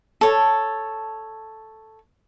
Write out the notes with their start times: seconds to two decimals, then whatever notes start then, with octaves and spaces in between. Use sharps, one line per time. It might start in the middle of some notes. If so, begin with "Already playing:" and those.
0.21 A4 C#5